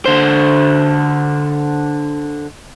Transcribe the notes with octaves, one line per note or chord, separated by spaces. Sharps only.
D3 C5